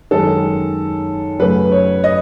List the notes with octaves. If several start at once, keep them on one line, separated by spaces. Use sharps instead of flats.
F#2 D#3 G#3 A4
F#2 C#3 F#3 A3 B4
C#5
D#5